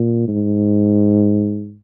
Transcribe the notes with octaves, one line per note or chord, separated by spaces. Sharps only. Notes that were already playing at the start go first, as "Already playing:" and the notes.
Already playing: A#2
G#2